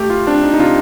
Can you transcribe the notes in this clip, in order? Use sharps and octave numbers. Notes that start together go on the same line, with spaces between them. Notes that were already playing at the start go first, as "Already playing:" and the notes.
Already playing: A3 G4
F4
C4 D4
D#4
D#4
C3 F4